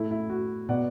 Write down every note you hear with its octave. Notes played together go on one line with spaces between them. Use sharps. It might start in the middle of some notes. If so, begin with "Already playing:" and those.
Already playing: A2 A3 E4
E4
F#4
B2 B3 D5 F#5